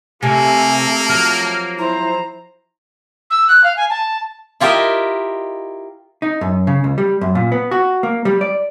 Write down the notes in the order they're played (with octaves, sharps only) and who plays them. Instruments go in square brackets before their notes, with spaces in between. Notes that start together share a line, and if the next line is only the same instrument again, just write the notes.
[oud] C3 [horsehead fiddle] A3 A4 [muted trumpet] A#3 [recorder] G#5
[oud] F3 F#3 [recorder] F6
[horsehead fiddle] E4 C5 [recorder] A#5
[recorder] E6
F#6
F5
G#5
A5
[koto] E4 F4 G4 A#4 D#5 E5
[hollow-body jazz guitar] D#4
F#2
C#3
C#2
G3
F#2
A#2
B3
F#4
A#3
G3
D5